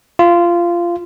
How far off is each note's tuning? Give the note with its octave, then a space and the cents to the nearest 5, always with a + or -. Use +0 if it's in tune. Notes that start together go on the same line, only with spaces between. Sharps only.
F4 -15